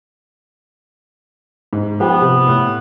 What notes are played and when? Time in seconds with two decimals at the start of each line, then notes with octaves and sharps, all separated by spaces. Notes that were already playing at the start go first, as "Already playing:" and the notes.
1.73 G#2
2.00 F3 B3 G4
2.22 C3
2.47 A2